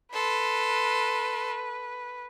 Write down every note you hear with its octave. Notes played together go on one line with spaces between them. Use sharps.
A4 B4 C6